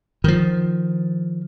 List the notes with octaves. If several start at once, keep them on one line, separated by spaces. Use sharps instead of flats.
D#3 F3